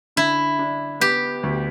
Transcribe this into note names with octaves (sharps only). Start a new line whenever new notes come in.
D3 E4
D4
B3 G4
D2